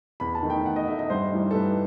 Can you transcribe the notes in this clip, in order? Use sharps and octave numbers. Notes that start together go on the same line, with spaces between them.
E2 B5
A5
D#3 A3 D#4
G5
E2 F#5
D#5
D#3 A3 D#4 E5
D#5
G2 C5
E3 G3 D#4
A4
G2 B4